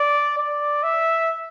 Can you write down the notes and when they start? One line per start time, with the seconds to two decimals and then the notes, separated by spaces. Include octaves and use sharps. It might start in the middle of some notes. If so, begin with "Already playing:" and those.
Already playing: D5
0.38 D5
0.83 E5